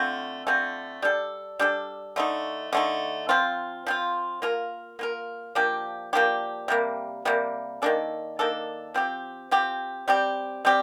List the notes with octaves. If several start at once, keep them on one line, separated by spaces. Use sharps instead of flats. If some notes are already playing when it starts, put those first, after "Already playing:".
Already playing: D3 A3 C4 F4
D3 A3 C4 F4
G3 D4 A4
G3 D4 A4
D3 A3 D#4
D3 A3 D#4
F3 C4 F4
F3 C4 F4
A#3 F4 A#4
A#3 F4 A#4
F3 A#3 D4 G4
F3 A#3 D4 G4
C3 G3 A#3
C3 G3 A#3
D#3 A#3 D4 A4
D#3 A#3 D4 A4
F3 C4 G4
F3 C4 G4
G3 C4 G4
G3 C4 G4